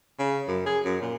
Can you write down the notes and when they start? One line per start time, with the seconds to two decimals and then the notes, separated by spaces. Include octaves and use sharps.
0.19 C#3
0.48 F#2
0.66 G#4
0.85 F#2
1.02 A#2